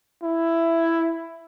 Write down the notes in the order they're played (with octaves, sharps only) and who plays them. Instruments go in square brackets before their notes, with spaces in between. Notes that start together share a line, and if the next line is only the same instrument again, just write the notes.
[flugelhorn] E4